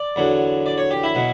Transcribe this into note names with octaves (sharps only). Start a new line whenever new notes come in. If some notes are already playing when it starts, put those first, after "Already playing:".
Already playing: D5
E2 D3 F#3
D5
C#5
G4
E4
B2 F#3